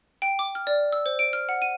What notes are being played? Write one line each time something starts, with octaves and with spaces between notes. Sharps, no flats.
G5
D6
F6
D5
E6
C5
D7
F6
F#5
D#7